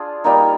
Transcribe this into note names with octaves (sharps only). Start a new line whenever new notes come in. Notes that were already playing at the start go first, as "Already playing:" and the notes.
Already playing: D4 F4 G#4
G3 A#3 D#4